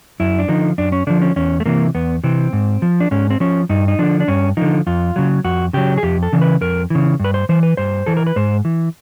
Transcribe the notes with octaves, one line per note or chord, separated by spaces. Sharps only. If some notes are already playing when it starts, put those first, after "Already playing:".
F#2 E4
D4
D3 F3 D#4
F#2 D4
C#4
D3 F3 D4
C#4
E2 C#4
A3
C3 E3 A#3
E2 B3
C3 E3 C4
G#2
F3
D4
G#2 C#4
C4
F3 C#4
G2 D#4
D#4
D3 F3 D4
D4
G2 C#4
D3 F3 D#4
F2 F4
C#3 F#3
F2 F#4
C#3 F#3 G4
G#4
F2 G4
A4
C#3 E3
B4
F2 A#4
C#3 E3
G2 B4
C5
E3 C5
B4
G2 C5
E3 A4
A#4
B4
G#2 C5
E3